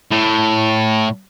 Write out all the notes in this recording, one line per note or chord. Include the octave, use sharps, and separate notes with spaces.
A2